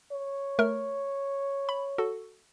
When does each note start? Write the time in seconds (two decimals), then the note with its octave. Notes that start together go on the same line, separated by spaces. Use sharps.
0.11 C#5
0.59 A3 A#4 F6
1.69 B5
1.98 F#4 A4